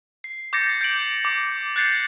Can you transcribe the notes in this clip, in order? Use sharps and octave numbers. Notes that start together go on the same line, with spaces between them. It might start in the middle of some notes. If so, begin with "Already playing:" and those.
C7
D6 G6 A6 A#6 C#7
G6 C7 D7 F#7
D6
F#6 G6 A6 C7 C#7 F#7